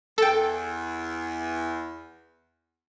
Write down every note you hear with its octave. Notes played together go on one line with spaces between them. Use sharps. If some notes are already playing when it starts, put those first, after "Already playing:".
E2 A4 G5